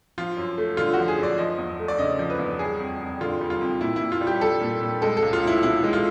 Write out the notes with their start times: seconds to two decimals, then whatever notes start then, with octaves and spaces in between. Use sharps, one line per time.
0.18 F3 F4
0.37 F#2
0.58 A3
0.77 D3 F4
0.94 F#4
0.99 F3
1.08 G#4
1.18 F#2 D5
1.38 F3 D#5
1.58 E2
1.79 A3
1.88 D5
1.98 C#3 D#5
2.19 F3
2.30 B4
2.39 E2
2.59 G3 G#4
2.80 F2
3.01 F2
3.21 D3 F4
3.41 G3
3.50 F4
3.61 F2
3.81 A#2 E4
3.96 A#2 E4
4.12 F4
4.21 G3
4.27 G4
4.41 G3 A4
4.61 A#2
4.82 A#2
5.02 G#3 A4
5.17 A4
5.23 C#2
5.33 F4
5.43 C#2 E4
5.63 B2 E4
5.84 G#3
5.93 F4